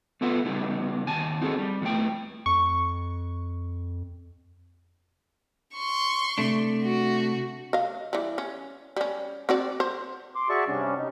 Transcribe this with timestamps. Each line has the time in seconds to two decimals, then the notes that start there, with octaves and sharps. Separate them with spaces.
0.21 B3 F4 A4 B4 E5 F#5
0.45 C#3 G3 B3 C#4 D#4 G4
1.07 D#2 G#5 A5
1.41 C4 D#4 F#4 G#4 A4
1.59 G3
1.81 E2 C3 E3 A3 G5
2.46 F2 C#6
5.75 C6 C#6
6.38 C3 A3 D4
6.83 F#4
7.73 D#5 F5
8.13 E3 G3
8.38 C#4
8.97 G3 C#4
9.49 C4 F#4 D5
9.80 C5
10.35 C6 D6
10.49 F#4 G#4 D5 E5 A5 C#6
10.68 G2 C3 G3 C#4 D4
10.98 D#4